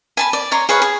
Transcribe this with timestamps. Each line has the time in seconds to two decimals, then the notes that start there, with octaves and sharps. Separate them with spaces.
0.17 G#5 A5 B5
0.33 D5
0.52 C#5 A#5 C6
0.69 G#4 B4 C#5 F5
0.82 G#4